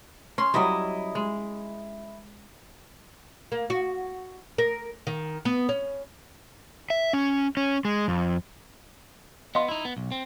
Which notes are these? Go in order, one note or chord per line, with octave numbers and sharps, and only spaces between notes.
C#4 C6
F#3 G3 E4 D#5
G#3
A#3
F#4
A#4
D#3
B3
C#4
E5
C#4
C#4
G#3
F2
B3 D#5 F5 C6
D#4 E4
B3
B1
C4